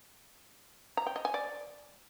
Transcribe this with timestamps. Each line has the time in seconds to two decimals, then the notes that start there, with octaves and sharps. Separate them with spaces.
0.97 A#5
1.07 G5
1.16 D#5
1.25 G#5
1.34 D5